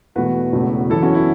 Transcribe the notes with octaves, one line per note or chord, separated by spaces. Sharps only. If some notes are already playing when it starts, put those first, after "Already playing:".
E2 B2 A3 F#4 B4
E1 E2 C#3 A3
F#2 E3 B3 E4 A4
C#4 F#4
E4